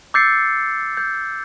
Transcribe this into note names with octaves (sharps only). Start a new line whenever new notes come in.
D6 E6 G6 A6 C7 C#7
G6